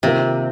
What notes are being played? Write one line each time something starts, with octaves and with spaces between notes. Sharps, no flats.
C3 D#3 A#3 F4 A#4